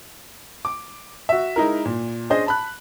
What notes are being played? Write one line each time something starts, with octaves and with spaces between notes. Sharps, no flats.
D6
F#4 E5
G#3 D#4 E4 A#4
A#2
C#4 D4 G#4 C5 D#5
A5 B5 F#6